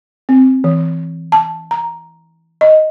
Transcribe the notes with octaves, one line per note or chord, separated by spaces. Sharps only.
C4
E3
A5
A#5
D#5